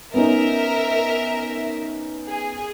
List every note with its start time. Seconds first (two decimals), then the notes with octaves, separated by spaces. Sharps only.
0.14 B3 C#4 D#4 A#4 E5
2.28 G#4